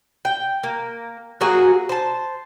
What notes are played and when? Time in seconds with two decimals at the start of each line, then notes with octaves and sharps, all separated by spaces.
0.25 G5
0.63 A#3
1.41 F#3 A#3 F#4 G#4
1.89 C5 A5